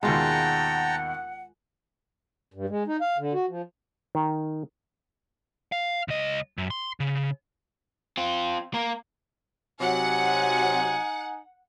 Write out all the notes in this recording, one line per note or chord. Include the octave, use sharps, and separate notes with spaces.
D#2 B2 G#3 F4 F#5 G5 A5 A#5
G2
G#3
D#4
F5
D3
F#4
F3
D#3
F5
C#2 D#5
F#2
C6
C#3
C4 F4
A#3 A#4
C3 F#3 D#4 F#5 G#5